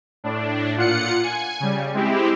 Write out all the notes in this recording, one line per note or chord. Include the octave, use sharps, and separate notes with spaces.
A2 D4
A#2 F4 F#5 C#7
G#5
C#3 G3
G#3 C4 E4 G4